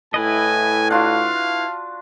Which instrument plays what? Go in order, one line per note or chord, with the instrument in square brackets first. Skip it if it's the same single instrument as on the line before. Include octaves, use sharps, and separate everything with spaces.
[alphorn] A2 [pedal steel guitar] E4 B4 D#5 [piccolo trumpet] G#5
[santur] D4 F4 F#4 [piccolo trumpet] F5